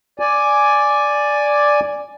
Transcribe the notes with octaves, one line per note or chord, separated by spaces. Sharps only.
D5 G#5